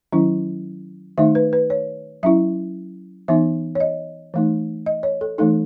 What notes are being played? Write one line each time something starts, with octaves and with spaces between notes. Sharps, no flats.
D#3 F#3 C#4 E4
D#3 A3 D#4 E5
B4
B4
C#5
F#3 C#4 E4 E5
E3 B3 D#4 E5
C#5
D#5
E3 A3 D#4
D#5
C#5
A4
E3 A3 D#4 A4